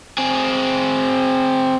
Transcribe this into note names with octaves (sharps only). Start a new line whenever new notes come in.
C4 G#4